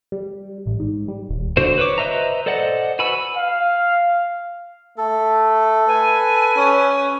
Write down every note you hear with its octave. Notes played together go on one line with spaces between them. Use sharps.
G3
A1
G#2
G3
D#1
D3 F#4 C5
B4 C#5 D6
B4 C5 D#5 E5 A#5
A4 C5 D5 D#5 F#5
F#4 B4 G#5 B5 E6
F5
A3 A4
B4 G#5
C#4